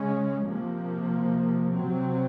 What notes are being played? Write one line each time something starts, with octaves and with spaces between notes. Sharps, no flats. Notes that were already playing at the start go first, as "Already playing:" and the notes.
Already playing: C#3 G#3 C#4
C3 F3 A#3
C3 F#3 C4